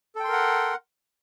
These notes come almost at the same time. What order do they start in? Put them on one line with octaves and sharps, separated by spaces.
A4 G5 C6 A#4 F#5